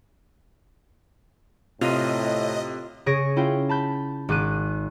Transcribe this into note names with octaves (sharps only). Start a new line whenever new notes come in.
A2 C3 F4 D#5 D#7
C#3 G#4 C#5 A#6 D7 D#7
C#4 E4 F4 G5
A5 B5 G6
G#1 D6 F#6 D#7